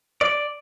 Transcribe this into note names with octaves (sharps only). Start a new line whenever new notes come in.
D5